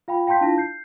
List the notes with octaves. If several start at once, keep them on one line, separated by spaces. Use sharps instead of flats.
F4 F5 G5 B5
F5 G5 A5 C6 G6 B6
D4 E4 F4 F5 A5 A#6
G6 C7